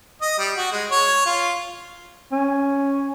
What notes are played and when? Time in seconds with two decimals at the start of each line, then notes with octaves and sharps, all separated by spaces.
0.22 D#5
0.39 G3
0.57 F#4
0.73 G#3
0.91 C#5
1.26 F4
2.32 C#4